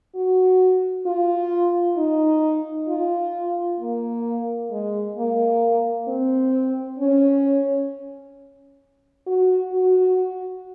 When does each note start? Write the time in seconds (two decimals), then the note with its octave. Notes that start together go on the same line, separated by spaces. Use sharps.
0.16 F#4
1.06 F4
1.97 D#4
2.89 F4
3.80 A#3
4.71 G#3
5.17 A#3
6.08 C4
6.99 C#4
9.27 F#4
9.73 F#4